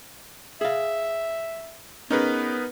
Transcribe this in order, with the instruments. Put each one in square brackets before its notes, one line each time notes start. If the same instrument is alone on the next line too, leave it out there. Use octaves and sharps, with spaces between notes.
[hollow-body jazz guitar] G#4 F5 [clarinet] E5
[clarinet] B3 [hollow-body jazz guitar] C#4 G#4 [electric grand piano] D#4 A#4 B4